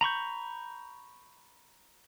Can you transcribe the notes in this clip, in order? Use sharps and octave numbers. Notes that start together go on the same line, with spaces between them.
A#5 B5 C#6 G6